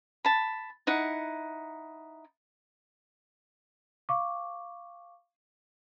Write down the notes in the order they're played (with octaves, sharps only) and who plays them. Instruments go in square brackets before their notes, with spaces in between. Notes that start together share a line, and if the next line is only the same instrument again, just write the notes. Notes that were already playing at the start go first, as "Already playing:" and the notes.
[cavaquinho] A5 B5
D#4 E4 F#5
[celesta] F5 C#6 D6